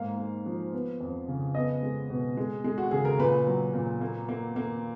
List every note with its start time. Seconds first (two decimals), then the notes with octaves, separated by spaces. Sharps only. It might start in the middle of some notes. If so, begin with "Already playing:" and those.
Already playing: G#2 A#3 F5
0.18 A#3
0.46 F3
0.73 B3
1.01 F2
1.28 C#3
1.55 B3 D#5
1.83 G#3
2.10 B2
2.37 G#3
2.64 G#3
2.78 F#4
2.91 C#3 G#4
3.05 A#4
3.19 A#2 B4
3.47 F#3
3.74 A#2
4.01 A#3
4.29 A#3
4.56 A#3